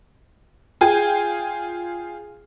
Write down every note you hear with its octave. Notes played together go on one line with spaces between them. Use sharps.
F4 G#4 G5 G#5